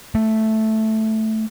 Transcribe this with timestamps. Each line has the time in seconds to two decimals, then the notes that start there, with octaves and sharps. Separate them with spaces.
0.15 A3